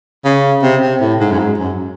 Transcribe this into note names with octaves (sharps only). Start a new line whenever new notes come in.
C#3
C3
C3
A2
G#2
F#2
G#2
F#2